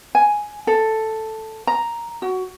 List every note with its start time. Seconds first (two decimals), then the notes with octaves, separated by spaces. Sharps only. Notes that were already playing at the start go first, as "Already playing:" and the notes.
0.15 G#5
0.67 A4
1.67 A#5
2.22 F#4